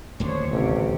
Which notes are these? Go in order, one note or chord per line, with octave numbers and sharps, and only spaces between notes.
D#1 D2 D4 C5 C#5
A1 C3 G3